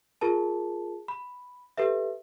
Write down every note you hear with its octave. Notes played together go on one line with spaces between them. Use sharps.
F4 G#4 A#4 A5
B5
G4 A4 B4 E5